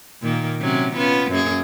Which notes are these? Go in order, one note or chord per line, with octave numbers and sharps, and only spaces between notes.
A#2 D#3 A#3
C3 F#3 C#4
B3 C#4 F4
F#2 A#3 G#4